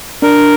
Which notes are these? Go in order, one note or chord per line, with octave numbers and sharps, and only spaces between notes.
D4 A#4